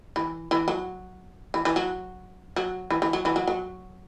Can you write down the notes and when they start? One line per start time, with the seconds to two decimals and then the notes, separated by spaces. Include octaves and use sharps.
0.16 E3
0.51 E3
0.68 F#3
1.54 E3
1.65 E3
1.76 F#3
2.56 F#3
2.91 E3
3.02 E3
3.13 F#3
3.25 E3
3.36 F#3
3.48 F#3